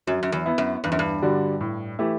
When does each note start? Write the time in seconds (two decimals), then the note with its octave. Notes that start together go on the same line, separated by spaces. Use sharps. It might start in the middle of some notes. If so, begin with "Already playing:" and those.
0.07 F#2 F#3
0.23 F#2
0.32 E2
0.46 B3 E4
0.58 F#2
0.84 E2 G2
0.92 F#2
0.99 G2
1.22 D3 G3 D4 F#4
1.61 A2
1.99 E3 A3 E4 G4